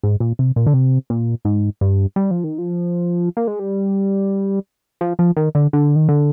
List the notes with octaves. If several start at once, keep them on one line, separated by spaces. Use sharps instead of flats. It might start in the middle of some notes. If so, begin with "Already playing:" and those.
G#2
A#2
C3
A#2
D3
C3
A#2
G#2
G2
G3
F3
D#3
F3
A#3
G#3
G3
F3
F3
D#3
D3
D3
D#3
D3